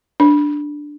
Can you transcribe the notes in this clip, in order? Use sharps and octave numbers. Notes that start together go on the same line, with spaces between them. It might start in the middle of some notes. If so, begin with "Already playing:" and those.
D4